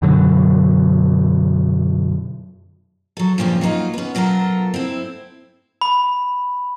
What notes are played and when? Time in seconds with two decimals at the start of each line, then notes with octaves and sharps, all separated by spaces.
0.02 F#2 B2 D3 F#3
3.17 F#3 A4
3.38 G2 A#2 C#3 F3 C#4 G4
3.61 F#3 A#3 B3 D#4 F4
3.93 B3 C#4
4.15 B2 F#3 F4 A4 A#4
4.74 C4 E4
5.81 B5